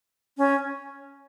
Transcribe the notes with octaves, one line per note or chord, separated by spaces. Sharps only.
C#4